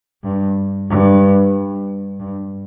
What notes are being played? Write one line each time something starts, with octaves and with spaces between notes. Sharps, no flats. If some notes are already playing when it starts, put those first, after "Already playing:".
G2
G2
G2